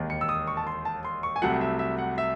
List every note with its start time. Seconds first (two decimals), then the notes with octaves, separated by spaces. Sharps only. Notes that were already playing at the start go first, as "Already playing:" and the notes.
Already playing: E1 D#2 D#3
0.10 C#7
0.21 E6
0.29 D#6
0.47 C#6
0.57 A5
0.67 C6
0.85 A5
1.05 C6
1.23 C#6
1.36 G#5
1.42 C2 C3 F#3 A3 F#5
1.61 E5
1.79 E5
1.99 F#5
2.18 E5